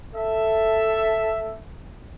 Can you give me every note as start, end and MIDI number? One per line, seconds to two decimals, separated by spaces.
0.15 1.60 69
0.15 1.60 76